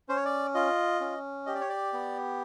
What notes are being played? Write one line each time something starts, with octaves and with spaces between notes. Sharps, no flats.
C#4 C5
C#5
D5
F4 D#5
C#4
G4 D#5
D5
C#5
D5
B3